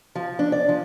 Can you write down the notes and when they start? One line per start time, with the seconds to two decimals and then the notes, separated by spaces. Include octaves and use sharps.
0.15 F3
0.39 D4
0.52 D5
0.69 F3